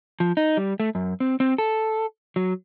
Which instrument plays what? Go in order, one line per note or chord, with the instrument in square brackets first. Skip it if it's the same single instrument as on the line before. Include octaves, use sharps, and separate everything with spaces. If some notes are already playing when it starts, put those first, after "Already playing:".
[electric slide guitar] F3
D#4
G3
A3
F#2
C4
C4
A4
F#3